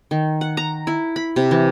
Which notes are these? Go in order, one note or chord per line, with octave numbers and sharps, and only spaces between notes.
D#3
F#5
A#5
E4
B5
C3
E3